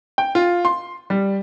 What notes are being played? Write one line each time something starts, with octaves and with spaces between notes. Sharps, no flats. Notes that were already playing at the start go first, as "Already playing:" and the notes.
G5
F4
C6
G3